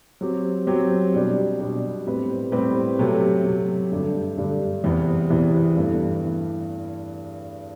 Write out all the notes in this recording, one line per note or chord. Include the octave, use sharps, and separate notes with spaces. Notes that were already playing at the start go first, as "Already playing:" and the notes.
F#3 C4 G4
F#3 C4 G4
B2 G3 D4 G4
B2 G3 D4 G4
A2 G3 C4 G4 B4
A2 G3 C4 G4 B4
C3 F#3 A3
C3 F#3 A3
G2 D3 A3 D4 G4
G2 D3 A3 D4 G4
E2 C3 E3 B3
E2 C3 E3 B3
G2 E3 A3
E3